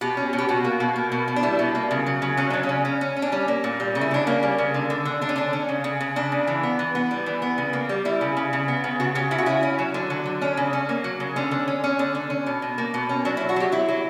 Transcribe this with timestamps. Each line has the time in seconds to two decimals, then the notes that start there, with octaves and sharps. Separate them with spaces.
0.01 B2 G4
0.17 C#4
0.33 B2
0.38 G4
0.49 B2 F#4
0.65 A#3
0.80 B2
0.96 A#3
1.12 B2
1.28 B2
1.36 D4
1.43 G3 E4
1.59 B2
1.75 A#3
1.91 C#3
2.06 F#3
2.22 C#3
2.37 F#3 C#4
2.50 C#3 D4
2.63 C#4
2.69 C#3
2.85 C#4
3.01 C#4
3.16 C#4
3.22 D4
3.32 G3 C#4
3.48 A#3
3.64 A#2
3.80 G3
3.95 C#3
4.01 E4
4.11 C#3 D4
4.27 A#3 C#4
4.43 G3
4.58 C#3
4.74 D3
4.90 D3
5.05 D3
5.21 D3 D4
5.29 C#4
5.36 D3 D4
5.53 C#4
5.69 C#3
5.84 C#3
6.01 C#3
6.16 C#3 D4
6.32 C#3
6.47 E3
6.63 B3
6.79 E3
6.95 B3
7.11 G3
7.26 E3
7.42 B3
7.58 C#3
7.73 A#3
7.89 G3
8.05 G3 E4
8.21 C#3
8.37 C#3
8.53 C#3
8.68 B3
8.84 C#3
9.00 C#3 F#4
9.15 C#3 G4
9.31 C#3 E4
9.38 F#4
9.46 C#4 E4
9.63 C#4
9.79 F#3
9.94 D3
10.10 F#3
10.26 D3
10.41 C#4 D4
10.57 C#3
10.73 C#4
10.89 A#3
11.04 F#3
11.20 C#3
11.36 D3 C#4
11.51 D3
11.68 C#4
11.84 C#4
11.99 D3
12.15 D3
12.30 C#4
12.46 B2
12.62 B2
12.78 A#3
12.94 B2
13.09 C#4
13.25 F#3 D4
13.37 E4
13.41 B2
13.49 F#4
13.56 F#3 G4
13.72 F#3 E4
13.89 F#3